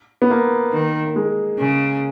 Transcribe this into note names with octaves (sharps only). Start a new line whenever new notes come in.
B3
A#3
D#3
A#3
G#3
C#3